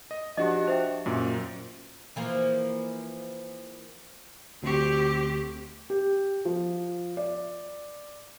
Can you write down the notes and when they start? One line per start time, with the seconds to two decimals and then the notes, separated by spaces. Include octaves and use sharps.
0.11 D#5
0.37 F3 D4 F#4 G4 D#5
0.67 C5 E5 G5
1.06 F#2 A#2
2.16 E3 F3 A#3
4.63 D2 C4 G4 C#6
5.90 G4
6.45 F3
7.17 D5